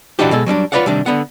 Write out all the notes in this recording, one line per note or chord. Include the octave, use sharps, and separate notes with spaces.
A#2 E3 D4 D#4 F#4 G4
B2 G#3 A4
F#3 G3 C#4 D4
F4 B4 C#5 D5 F5 F#5
C3 D#3 G3 D4
D3 B3 F#5